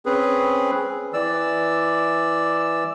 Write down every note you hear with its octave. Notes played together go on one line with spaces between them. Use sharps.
C4 C#4 G#4 B4
E3 D5 E6